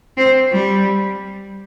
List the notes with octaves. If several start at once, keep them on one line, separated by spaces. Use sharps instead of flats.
C4
G3